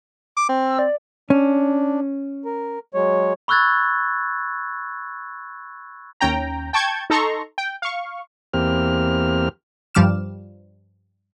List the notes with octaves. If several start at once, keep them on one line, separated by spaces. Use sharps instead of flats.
D6
C4
E6
D5
C#4 D4
A#4
F#3 G#3 C#5
B5 C#6 E6 F#6 G#6 A6
D#2 C#4 G5 A#5
G5 A5 C#6 G6 G#6
D#4 A4 A#5 C6 C#6
G5
F5 C#6
E2 A#3 C4 G4 F6
G2 F3 G3 D6 F6 E7